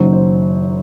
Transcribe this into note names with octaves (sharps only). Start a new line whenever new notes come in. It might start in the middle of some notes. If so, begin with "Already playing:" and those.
Already playing: F#1 F#2 D#3 F#3 C5
C5